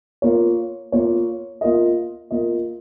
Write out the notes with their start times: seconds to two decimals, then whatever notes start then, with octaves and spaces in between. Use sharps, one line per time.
0.22 A#3 F4 A#4 C#5
0.92 A#3 F4 A#4 C#5
1.61 A#3 F4 A#4 D#5
2.31 A#3 F4 A#4 D#5